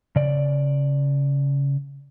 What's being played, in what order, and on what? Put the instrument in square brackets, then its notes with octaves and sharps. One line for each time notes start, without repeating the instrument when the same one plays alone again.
[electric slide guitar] C#3 D5